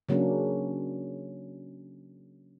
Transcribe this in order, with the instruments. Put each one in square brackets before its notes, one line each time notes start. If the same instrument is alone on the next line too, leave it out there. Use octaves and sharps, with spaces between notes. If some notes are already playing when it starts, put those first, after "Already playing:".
[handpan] C#3 F#3 A#3 C#4 D4